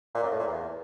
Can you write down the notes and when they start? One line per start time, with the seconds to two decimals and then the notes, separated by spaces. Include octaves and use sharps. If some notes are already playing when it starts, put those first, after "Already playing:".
0.15 A#2
0.23 F#2
0.31 A2
0.39 A#2
0.48 E2